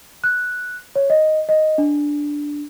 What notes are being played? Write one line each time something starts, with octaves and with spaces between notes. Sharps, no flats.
F#6
C#5
D#5
D#5
D4